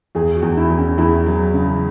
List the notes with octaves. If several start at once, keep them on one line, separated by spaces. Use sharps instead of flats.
E2 G#4
F#4
E2
E4
E2
C#4
E2 E4
F#3
C#3